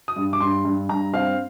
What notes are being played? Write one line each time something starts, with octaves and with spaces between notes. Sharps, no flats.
D#6
G2
D6
G2 C6
G2
G2 A#5
C4 F5